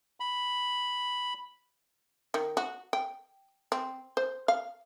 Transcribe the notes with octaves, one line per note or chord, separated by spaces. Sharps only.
B5
D#3
F#4
G5
C4
C5
F5